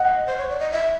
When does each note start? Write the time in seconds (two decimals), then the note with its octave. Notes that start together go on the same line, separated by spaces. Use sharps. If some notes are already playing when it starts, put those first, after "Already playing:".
Already playing: D#5 F#5
0.27 C5
0.37 C#5
0.49 D5
0.59 D#5
0.71 E5